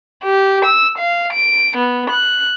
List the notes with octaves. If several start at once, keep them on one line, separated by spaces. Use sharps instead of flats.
G4
E6
F5
D7
B3
F#6